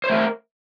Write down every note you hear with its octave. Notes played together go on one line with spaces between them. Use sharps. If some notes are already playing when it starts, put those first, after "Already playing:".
A3 A#4 C5 C#5